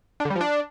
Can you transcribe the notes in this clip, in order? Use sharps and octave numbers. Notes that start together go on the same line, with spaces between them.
D4
D3
G3
F3
D4